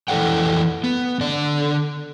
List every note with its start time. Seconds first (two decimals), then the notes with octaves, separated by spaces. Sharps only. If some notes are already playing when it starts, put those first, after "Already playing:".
0.08 F2 E3 A4 D5 F#5 G5
0.84 B3
1.21 D3 D5